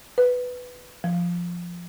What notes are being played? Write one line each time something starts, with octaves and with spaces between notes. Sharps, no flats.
B4
F3